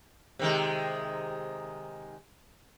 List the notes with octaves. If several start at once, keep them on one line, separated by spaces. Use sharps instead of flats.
C3 D#3 G#3